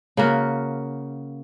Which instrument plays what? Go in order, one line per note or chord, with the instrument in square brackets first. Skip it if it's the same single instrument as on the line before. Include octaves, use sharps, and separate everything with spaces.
[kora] C#3 A#3 F#4